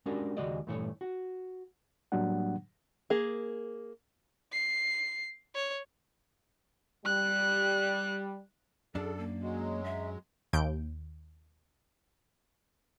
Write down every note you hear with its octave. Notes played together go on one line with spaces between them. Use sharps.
G#3 C#4 D4 F#4 G4 A#4
D#2 C#3 G#3 F#4 D5 D#5
G2 A#2 E3 A3 B4 C#5
F#4
A2 F#3 G3 A#3 D4 F#5
A#3 G#4
C7
C#5
G3 F#6
F#2 D4 G#4 A4
A#3
F#3 G#3
E5
D#2 G6 D7